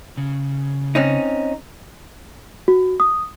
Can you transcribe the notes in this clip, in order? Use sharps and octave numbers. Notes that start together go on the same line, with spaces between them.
C#3
C4 C#4 D#4
F#4
D#6